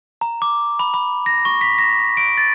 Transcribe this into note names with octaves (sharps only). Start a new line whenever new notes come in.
A#5
D6
B5
B5
A#6
C#6
B6
A#6
D7
A6